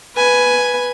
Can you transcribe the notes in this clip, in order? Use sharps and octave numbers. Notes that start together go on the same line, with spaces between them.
B4 G#5